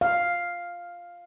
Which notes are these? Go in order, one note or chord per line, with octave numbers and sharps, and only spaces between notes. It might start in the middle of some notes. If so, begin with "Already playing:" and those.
F5